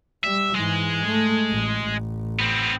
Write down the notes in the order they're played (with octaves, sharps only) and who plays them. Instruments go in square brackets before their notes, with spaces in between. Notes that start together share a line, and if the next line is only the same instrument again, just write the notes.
[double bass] G3 [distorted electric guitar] E5
[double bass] G#2 E3 [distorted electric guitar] G#3
[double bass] A3
A1
A1
[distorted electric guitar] B3 C4